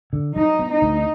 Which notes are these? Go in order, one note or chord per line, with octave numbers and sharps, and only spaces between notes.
D3
F#3 D#4
B3
D#4
D2